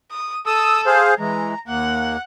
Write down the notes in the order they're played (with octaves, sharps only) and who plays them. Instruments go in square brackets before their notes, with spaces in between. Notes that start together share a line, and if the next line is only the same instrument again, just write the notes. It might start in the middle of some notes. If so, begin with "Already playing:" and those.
[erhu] D#6
[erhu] A4 [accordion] D#6 E6
[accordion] G#4 C5 F5
[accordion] E3 G#3 [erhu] A#5
[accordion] D#2 A#3 [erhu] F#5